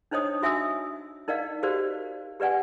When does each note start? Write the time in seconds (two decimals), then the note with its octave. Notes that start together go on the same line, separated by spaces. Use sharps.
0.11 D4 D#4 C5 C#5 D#5 D#6
0.43 F#4 E5 G#5 D#6 E6
1.28 D#4 A#4 D5 D#5 F5
1.63 F#4 G4 A#4 C5 D5 F5
2.40 G4 B4 D5 F#5 G#5